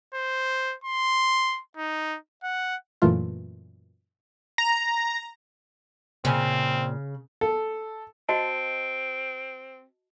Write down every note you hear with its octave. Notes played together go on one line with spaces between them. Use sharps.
C5
C6
D#4
F#5
F#2 A#2 E3 A3 F4
A#5
A#2 C#3 C4 G#5
A4
C4 F#4 D#5 A5